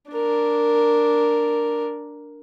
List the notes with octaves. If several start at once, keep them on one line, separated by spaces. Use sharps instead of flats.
D4 A#4